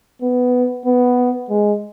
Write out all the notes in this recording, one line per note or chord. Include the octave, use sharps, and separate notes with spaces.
B3
B3
G#3